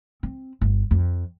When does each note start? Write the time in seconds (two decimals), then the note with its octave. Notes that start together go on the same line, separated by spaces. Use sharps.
0.23 C4
0.61 G1
0.91 F2